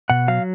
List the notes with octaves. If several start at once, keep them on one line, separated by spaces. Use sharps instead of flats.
B2 F#5
F#3 F5